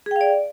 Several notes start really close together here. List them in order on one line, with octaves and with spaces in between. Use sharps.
G#4 G5 F5 D5